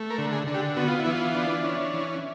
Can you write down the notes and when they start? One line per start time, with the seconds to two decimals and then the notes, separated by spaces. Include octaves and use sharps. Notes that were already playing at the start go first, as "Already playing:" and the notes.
Already playing: A3
0.10 A#4
0.18 D3
0.32 G#4
0.47 D3
0.54 G4
0.76 B3 F#4
0.88 F4
1.00 E4
1.06 E3
1.11 F4
1.35 D4
1.64 C#4
1.93 E3